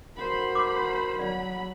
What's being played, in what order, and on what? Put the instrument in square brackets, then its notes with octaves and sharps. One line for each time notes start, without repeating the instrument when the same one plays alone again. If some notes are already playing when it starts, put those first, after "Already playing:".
[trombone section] F#4 A#4 [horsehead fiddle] C5 B5
[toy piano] D6
[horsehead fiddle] F#3 B5 [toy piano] D5